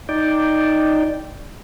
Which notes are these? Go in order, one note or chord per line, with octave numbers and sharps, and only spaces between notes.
D#4 D5 G5